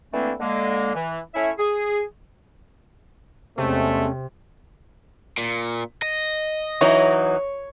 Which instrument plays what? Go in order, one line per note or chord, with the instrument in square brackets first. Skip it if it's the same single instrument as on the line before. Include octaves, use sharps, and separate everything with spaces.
[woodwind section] D3 E3 A3 A#3 C4 D4
D3 G#3 A#3
E3
A3 C#4 E4 C#5 E5
G#4
[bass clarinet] E2 [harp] C3 [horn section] G#3 A3 [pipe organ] C4 C#4
[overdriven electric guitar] A#2
D#5
[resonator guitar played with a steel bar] E3 F#3 D#4 [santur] C#5